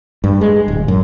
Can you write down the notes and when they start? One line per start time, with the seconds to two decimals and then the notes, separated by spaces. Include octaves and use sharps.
0.24 G2
0.41 G#3
0.68 D1
0.88 F#2